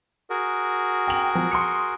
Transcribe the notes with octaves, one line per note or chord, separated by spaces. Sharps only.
F#4 G#4 A#4
G5 F#7
F3
C6 D#6 C#7